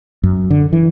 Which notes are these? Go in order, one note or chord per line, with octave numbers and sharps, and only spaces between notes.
F#2
D3
E3